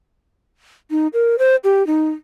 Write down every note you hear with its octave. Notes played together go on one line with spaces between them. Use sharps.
D#4
A#4
C5
G4
D#4